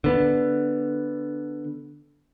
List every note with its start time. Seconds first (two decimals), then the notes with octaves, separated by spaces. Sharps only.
0.04 D3 B3